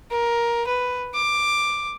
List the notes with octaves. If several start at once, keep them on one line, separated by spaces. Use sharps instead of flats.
A#4
B4
D6